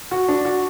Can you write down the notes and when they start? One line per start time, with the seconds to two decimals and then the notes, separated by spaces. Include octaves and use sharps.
0.11 F#4
0.28 D4
0.45 F#4